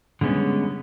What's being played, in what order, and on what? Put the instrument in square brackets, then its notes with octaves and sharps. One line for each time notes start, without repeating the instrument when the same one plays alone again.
[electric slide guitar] D3 G3 G#3 B3 C#4